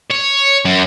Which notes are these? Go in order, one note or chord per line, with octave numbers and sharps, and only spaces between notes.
C#5
F#2